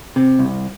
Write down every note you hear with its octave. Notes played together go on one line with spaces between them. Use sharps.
C3
C2